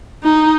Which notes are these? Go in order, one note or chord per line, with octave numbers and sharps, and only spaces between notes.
D#4